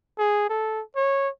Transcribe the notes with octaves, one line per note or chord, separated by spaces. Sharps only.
G#4
A4
C#5